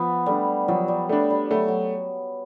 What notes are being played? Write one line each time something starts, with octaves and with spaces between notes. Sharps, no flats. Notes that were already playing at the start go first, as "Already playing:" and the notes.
Already playing: F3 B3
G3 A3 D4
F3 F#3
G3
G3 A3 D4
G3
F#3 A3
F#3